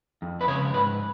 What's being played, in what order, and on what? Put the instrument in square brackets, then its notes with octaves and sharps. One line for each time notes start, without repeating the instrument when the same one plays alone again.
[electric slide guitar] F2
B4
C#3 F3 G#3 C#5
G#2 B4